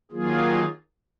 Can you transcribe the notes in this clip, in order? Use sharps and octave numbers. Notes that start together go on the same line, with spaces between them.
D#3 F#3 A#3 F4 G#4